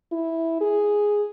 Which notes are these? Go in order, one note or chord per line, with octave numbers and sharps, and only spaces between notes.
E4
G#4